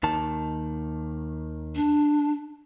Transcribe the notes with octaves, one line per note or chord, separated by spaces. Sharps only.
D#2 D#3 A5
D4